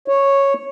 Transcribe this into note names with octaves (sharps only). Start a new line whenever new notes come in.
C#5